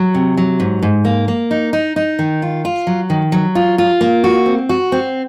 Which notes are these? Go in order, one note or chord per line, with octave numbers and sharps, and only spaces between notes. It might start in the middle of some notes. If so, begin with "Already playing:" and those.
Already playing: F#3
C3
F#3
G#2
G#2
A#3
A#3
D#4
D#4
D#4
D#3
F4
F4
F#3
D#3
F#3
F4
F4
A#3
F#4
C4
F#4
C4